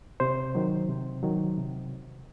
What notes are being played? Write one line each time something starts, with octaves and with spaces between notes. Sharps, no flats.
C3 C5
D#3 F#3
C3
D#3 F#3
C3